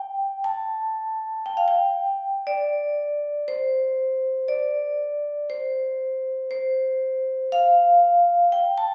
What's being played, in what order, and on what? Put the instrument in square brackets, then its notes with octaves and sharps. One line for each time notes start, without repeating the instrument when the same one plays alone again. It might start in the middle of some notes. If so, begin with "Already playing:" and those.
Already playing: [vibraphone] G5
A5
G5
F5
G5
D5
C5
D5
C5
C5
F5
G5
A5